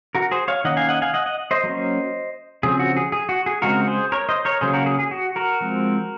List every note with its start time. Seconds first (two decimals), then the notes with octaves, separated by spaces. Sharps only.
0.15 F#4 A#4
0.31 G#4 C5
0.48 C#5 F5
0.64 D#3 A#3 C#4 D#5 F#5
0.77 F5 G#5
0.89 D#5 F#5
1.02 F5 G#5
1.14 D#5 F#5
1.26 D#5 F#5
1.51 C5 D#5
1.63 F#3 A#3 C#4
2.63 C#3 F3 C4 G#4
2.79 F#4
2.97 G#4
3.12 G#4
3.29 F#4
3.46 G#4
3.62 C#3 G#3 C4 F#4 A#4
3.87 G#4 C5
4.12 A#4 C#5
4.29 C5 D#5
4.45 A#4 C#5
4.61 C#3 F#3 A#3 G#4 C5
4.73 F#4 A#4
4.86 G#4
4.99 G#4
5.11 F#4
5.36 F#4 A#4
5.61 F3 G#3 C4